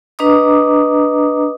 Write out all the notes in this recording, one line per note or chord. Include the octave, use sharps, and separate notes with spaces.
D4 B4 D#5 A#5 D6 D#6